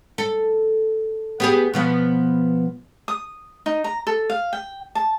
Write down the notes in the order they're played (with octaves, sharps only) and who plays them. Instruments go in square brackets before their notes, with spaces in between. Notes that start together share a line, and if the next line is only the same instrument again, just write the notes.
[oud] A4
B3 G4 G#4
B2 F3 B3
[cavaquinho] D#6
D#4
A#5
A4
F5
G5
A5